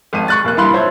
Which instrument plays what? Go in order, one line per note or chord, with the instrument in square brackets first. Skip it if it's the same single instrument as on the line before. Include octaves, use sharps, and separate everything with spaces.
[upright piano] G#1 F2 D#7
C#6 F#6 A6
F1 A#3 F#6
G2 E3 F5 B5 C6 F#6
F4 C5 C#5 E5